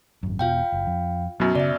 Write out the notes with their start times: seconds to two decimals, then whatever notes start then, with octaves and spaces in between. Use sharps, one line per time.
0.23 G#1 F#2
0.39 E1 B2 F4 F5 G5
0.72 F#1
0.87 F2
1.40 F#2 B2 F#3
1.55 C#3 D5 E5